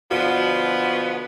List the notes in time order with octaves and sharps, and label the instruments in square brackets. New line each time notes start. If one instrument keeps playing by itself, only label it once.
[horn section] B2 D3 F3 [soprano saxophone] B3 [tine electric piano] F#4